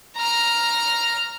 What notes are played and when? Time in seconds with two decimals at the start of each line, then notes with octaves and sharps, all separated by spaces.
0.16 A#5 F6